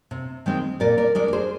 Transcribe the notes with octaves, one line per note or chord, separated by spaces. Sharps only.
C3
D#3 G#3 C4
A#2 A#4 D5
A#4 D5
G#3 D4 A#4 D5
A#4
G#4 C5